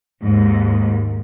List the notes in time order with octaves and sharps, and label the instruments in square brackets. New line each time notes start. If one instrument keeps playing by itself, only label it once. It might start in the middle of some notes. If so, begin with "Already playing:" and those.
[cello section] D#2 G#2